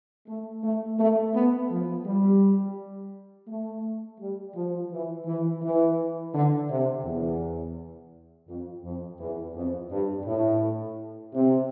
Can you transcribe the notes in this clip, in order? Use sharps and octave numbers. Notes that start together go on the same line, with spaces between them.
A3
A3
A3
B3
F3
G3
A3
G3
F3
E3
E3
E3
D3
C3
E2
F2
F2
E2
F2
G2
A2
C3